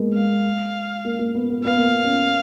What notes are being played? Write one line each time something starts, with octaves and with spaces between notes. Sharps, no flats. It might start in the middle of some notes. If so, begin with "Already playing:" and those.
Already playing: G#3 A#3 B3
F5
A#3
A#3
B3
B3
B3 F5
A#3
B3
C#4